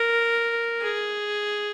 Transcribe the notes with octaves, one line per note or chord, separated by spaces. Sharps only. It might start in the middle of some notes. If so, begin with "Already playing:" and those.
Already playing: A#4
G#4